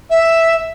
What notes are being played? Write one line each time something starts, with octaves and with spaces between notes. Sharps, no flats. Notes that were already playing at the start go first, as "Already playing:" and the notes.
E5